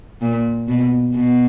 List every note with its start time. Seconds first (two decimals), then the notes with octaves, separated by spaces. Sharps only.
0.21 A#2
0.68 B2
1.14 B2